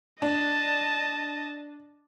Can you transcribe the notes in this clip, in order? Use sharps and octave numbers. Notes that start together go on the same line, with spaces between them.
D4 D#5 A5